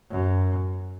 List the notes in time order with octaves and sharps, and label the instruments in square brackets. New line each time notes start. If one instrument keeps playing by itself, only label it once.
[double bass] F#2